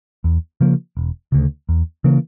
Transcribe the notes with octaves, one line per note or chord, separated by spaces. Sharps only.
E2
C#3 F3 A#3
E1
D2 C#3
E2
C#3 E3 A#3